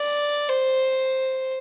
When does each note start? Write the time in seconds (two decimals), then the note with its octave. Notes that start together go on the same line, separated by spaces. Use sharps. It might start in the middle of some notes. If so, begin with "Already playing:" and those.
Already playing: D5
0.49 C5